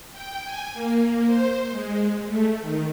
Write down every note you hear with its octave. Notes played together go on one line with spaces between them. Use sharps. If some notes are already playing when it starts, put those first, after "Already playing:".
G5
G#5
A#3
C5
G#3
A3
D#3